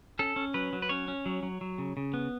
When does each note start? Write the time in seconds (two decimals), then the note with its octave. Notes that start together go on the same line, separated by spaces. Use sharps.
0.19 C#4 A4
0.36 C#4
0.54 F#3 B4
0.73 F#3
0.82 B4
0.89 C#4 C#5
1.08 C#4
1.26 F#3
1.43 F#3
1.61 F#3
1.78 C#3
1.97 C#3
2.14 B3